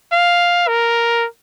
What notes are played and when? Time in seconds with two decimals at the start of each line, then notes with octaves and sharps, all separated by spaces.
0.12 F5
0.68 A#4